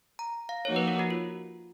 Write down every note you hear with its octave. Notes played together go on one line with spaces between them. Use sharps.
A#5
F5
F3 A#3 D#4 F#4 C#5
B4
A#4
F#4
F4